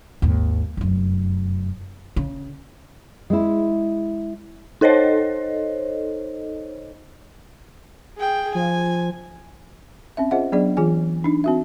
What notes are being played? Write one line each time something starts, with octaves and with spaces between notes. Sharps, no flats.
G#1 D#2
F1 F#2
C#3
G#3 E4
D#4 A4 C5 C#5 D#5
G#4 G5
F3 G#5
C4 C#4 E5
F4 G#4 C5 D#5 E5 F#5
F#3 B3 D4 G#4 D5
E3 F4 G#4 G#5
D4 D#4
C4 F#4 E5